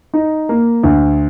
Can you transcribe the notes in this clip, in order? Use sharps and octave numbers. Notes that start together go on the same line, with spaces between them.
D#4
A#3
D2